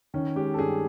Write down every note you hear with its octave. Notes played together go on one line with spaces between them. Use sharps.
D#3 C#4
G#3 G4
A4
G2 G#4